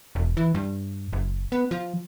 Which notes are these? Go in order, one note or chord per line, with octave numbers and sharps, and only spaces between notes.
E1
E3
G2
F#1
B3
F3